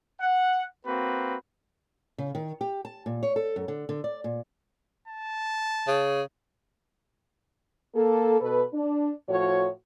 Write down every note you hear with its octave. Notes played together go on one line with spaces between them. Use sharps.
F#5
A#3 C4 F#4 B4
C#3
D#3
G4
A5
A#2
C#5
A4
F#2
D3
D3
D5
A#2
A5
C#3
A#3 A4
B2 A4 B4
D4
A2 F3 F#4 C#5